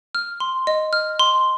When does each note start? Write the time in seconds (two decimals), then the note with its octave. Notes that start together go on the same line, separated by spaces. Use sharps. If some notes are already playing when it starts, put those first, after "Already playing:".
0.15 F6
0.40 C6
0.67 D#5
0.93 F6
1.19 C6